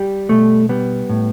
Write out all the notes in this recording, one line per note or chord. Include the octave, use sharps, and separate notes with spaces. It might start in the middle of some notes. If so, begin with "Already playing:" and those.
Already playing: G3 G4
B2 A3
G3 B3
A2